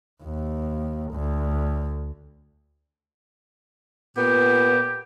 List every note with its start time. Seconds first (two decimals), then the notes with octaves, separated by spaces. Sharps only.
0.23 D#2
1.12 D2
4.17 A#2 B3 G4